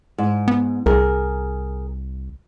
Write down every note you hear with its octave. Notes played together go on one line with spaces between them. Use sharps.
G#2
B3
C2 G#4 A#4